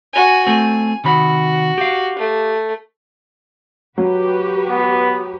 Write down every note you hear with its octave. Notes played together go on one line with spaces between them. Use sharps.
F#4 G#5
A3 C4 G#5
C3 D#3 F#4 B5
G4 F5
A3
F#3 F#4 G4 B4
B3